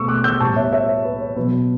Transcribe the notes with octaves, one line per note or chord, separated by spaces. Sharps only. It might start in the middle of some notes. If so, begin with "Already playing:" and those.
Already playing: B2 A3 C#6 E6
D6 F#6
E6 G6
A2 G3 B3 A5 C#6
C#5 E5
C#5 E5
C#5
B4
C#5
B2 F#3 B3 B4